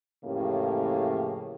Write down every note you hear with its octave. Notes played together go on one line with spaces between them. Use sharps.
F2 A2 C#3 E3 A#3 G4